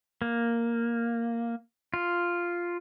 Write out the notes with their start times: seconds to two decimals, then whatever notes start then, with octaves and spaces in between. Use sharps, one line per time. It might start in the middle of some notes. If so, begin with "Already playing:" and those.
0.22 A#3
1.94 F4